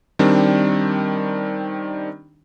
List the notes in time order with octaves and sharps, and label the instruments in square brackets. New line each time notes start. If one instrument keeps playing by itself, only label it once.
[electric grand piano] D#3 G3 C4 D4